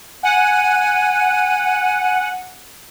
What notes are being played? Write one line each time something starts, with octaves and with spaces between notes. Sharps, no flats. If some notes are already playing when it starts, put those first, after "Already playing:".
F#5 G#5